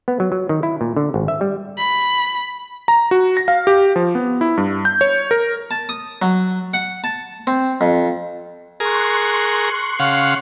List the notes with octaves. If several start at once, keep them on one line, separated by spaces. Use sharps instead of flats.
B3
F#3
F#3
D#3
E4
A#2
D3
G#1
E5
G3
B5
A#5
F#4
A#6
F5
G4
F3
B3
E4
G2
G6
C#5
A#4
A5
D#6
F#3
F#5
A5
C4
F2
G#4 A#4 C6 C#6 F#6
C#3 F5 F#5